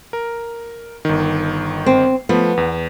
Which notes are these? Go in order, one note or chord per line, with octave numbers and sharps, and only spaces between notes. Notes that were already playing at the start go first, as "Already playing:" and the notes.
A#4
G1 D#3
C4
F3 A3 B3
E2